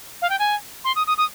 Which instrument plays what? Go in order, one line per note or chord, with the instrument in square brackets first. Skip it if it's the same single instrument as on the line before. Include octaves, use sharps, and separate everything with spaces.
[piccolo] F5
G5
G#5
C6
D#6
D#6
D#6